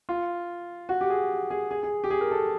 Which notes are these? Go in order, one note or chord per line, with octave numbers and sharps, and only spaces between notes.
F4
F#4
G4
G#4
G#4
G#4
G#4
G4
G#4
A#4
A4